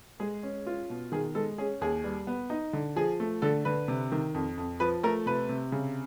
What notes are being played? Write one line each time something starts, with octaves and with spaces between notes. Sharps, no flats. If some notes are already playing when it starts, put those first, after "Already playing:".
G#3 G#4
C#4
F4
B2
D#3 G#4
G#3 A4
C#4 G#4
D#2 G#4
G3
B3
D#4
D3
F3 G#4
A3
D3 A4
D3 B4
C3
D#3
F2
F2
F3 B4
A3 A#4
C3 B4
C3
C#3